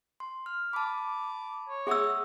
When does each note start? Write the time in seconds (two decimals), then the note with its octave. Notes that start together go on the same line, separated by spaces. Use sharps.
0.20 C6
0.46 F6
0.73 A5 B5 D6
1.69 C#5
1.87 G#4 E5 F#5 D#6 E6